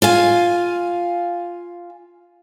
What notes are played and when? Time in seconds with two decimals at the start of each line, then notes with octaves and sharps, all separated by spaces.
0.02 F4 F5 G#5